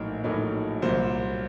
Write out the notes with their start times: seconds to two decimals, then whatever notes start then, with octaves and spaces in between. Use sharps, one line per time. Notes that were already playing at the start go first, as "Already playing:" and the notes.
Already playing: A#1 A2 F#3 A#3 D#4 A#4
0.24 A#1 A2 F#3 A#3 D#4
0.82 C2 A#2 F#3 A#3 C5